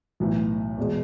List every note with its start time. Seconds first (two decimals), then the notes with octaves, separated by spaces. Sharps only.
0.20 B1 A2 E3
0.77 E2 B2 G#3